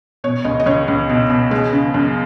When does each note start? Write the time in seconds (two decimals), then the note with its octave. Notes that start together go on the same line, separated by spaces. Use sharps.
0.24 B2 C#5
0.44 C#2 D#5
0.60 D#5
0.66 C#2 C#5
0.88 C#2
1.09 B2
1.30 B2
1.51 G#3
1.73 C#3
1.94 F#2